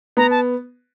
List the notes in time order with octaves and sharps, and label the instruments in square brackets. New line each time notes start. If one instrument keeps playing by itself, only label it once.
[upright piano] B3 [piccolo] A#5
[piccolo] A5